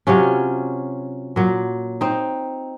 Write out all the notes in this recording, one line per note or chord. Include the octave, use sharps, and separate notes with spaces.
C3 F#3 C#4 F4
A#2 F#3
C4 D#4